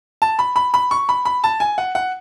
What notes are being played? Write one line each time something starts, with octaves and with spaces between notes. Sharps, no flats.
A5
B5
B5
B5
C#6
B5
B5
A5
G#5
F#5
F#5